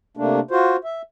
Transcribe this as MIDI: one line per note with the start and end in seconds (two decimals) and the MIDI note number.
0.17 0.40 48
0.17 0.40 57
0.17 0.40 58
0.17 0.40 62
0.51 0.76 65
0.51 0.76 66
0.51 0.76 72
0.84 1.02 76